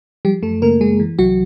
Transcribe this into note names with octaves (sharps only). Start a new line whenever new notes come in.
F3 G3 G4
F#2 A3 A4
C#3 A#3 A#4
F#2 G#3 G#4
E3
C2 F#3 F#4